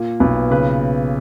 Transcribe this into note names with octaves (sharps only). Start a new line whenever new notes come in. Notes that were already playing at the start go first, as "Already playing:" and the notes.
Already playing: A#2 A#3
B1 B4
C#3 B4